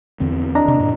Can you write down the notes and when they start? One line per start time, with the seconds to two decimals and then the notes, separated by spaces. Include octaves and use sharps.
0.20 E2 D3 C4
0.55 D4 D#5 A#5
0.68 C3
0.79 G2 A#2